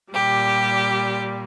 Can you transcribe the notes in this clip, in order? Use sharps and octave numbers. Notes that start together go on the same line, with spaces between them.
A#2 G3 G4